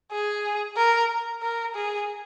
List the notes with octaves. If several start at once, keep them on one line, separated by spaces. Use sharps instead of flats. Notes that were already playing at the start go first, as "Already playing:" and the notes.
G#4
A#4
A#4
G#4